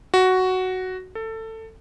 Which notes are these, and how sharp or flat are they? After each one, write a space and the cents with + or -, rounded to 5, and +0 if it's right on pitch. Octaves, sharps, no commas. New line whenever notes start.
F#4 +5
A4 +20